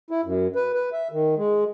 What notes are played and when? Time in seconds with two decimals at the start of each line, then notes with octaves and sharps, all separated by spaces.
0.11 E4
0.25 F#2
0.55 B4
0.74 B4
0.92 E5
1.12 D#3
1.38 G#3